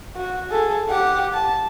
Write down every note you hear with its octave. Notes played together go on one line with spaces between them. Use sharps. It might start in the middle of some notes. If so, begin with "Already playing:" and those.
F#4
G#4 A4
G4 F#5
A5